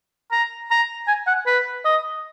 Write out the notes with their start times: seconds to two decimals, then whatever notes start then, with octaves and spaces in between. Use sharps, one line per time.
0.32 A#5
0.71 A#5
1.08 G#5
1.27 F#5
1.46 B4
1.85 D#5